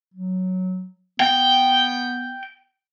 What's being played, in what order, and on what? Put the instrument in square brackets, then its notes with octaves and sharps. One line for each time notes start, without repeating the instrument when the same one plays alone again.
[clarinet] F#3
[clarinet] B3 [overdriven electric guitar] G5